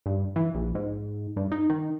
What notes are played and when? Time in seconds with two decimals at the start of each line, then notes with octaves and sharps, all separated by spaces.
0.06 G2
0.36 E3
0.54 A#1
0.75 G#2
1.36 G2
1.52 D#4
1.70 D#3